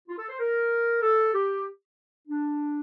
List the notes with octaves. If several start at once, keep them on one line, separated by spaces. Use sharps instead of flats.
F4
A4
C5
A#4
A4
G4
D4